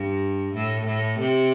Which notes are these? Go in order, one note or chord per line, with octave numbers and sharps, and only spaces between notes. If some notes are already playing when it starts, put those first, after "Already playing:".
Already playing: G2
A2
A2
C3